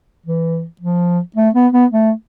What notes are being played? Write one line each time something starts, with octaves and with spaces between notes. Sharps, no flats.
E3
F3
A3
B3
B3
A3